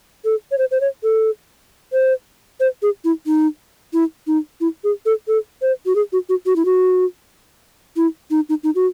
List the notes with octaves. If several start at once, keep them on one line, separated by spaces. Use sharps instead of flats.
A4
C#5
C5
C5
C#5
A4
C5
C5
G#4
E4
D#4
E4
D#4
E4
G#4
A4
A4
C5
F#4
G#4
F#4
F#4
F#4
E4
F#4
E4
D#4
D#4
D#4
F#4